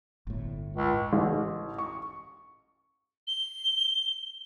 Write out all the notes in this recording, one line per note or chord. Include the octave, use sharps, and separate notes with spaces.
G1 A2
C#2
A1
C#6
G7